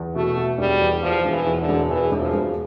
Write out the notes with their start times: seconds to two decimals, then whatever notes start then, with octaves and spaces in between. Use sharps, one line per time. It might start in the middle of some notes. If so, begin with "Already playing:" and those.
Already playing: E2
0.15 B2 A3
0.37 B2
0.58 E1 G3
0.81 E2
1.02 E2 F3
1.25 E1
1.31 E3
1.47 E2
1.61 D3
1.69 E1
1.90 E2 E3
2.12 E1
2.19 F3
2.34 E1